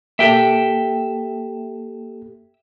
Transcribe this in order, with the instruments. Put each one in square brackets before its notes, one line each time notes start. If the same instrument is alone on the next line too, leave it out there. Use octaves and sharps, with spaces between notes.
[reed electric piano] A#3 G4 A4 [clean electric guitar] E5 G5